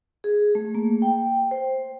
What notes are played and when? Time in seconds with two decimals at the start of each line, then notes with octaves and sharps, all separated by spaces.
0.24 G#4
0.55 A3
0.75 A#3
1.02 G5
1.51 C5